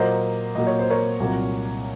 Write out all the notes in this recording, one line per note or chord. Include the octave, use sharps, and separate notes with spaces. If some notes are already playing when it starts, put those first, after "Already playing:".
Already playing: A#2 F#3 A#3 C5 D#5
A#2 F#3 A#3 D#5
C#5
C5
A#4 C#5
C2 A#2 F#3 A#3